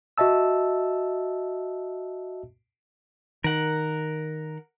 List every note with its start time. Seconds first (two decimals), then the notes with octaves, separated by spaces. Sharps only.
0.18 F#4 D#5 E5 A5 E6
3.44 D#3 A#4 F#5